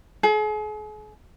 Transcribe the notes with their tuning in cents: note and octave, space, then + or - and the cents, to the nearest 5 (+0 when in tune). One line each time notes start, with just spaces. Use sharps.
G#4 +40